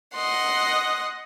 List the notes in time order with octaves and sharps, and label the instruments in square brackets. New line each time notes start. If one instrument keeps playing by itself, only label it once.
[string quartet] D#5 F#5 C6